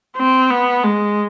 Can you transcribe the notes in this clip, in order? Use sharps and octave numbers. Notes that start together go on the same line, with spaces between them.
C4
B3
G#3